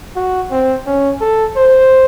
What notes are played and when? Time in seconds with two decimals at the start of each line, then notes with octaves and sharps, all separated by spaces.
0.16 F#4
0.51 C4
0.86 C#4
1.21 A4
1.57 C5